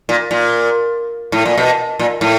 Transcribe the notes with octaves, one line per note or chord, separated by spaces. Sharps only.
A#2
A#2
A2
A#2
B2
A#2
A2